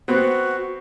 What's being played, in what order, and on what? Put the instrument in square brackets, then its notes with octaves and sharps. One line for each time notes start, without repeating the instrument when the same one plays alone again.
[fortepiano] B3 C4 [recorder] F#4